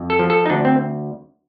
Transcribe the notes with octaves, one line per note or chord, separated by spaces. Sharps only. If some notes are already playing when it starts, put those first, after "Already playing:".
Already playing: F2
A4
F3
A4
D#4
D2 D4
C4